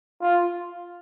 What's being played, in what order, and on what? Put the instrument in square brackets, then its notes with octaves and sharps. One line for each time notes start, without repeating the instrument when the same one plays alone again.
[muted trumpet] F4